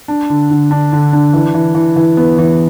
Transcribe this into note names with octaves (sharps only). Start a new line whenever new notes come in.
D4
D3
D3
D4
D3
D4
E3
E3
E3
E3
B3
E3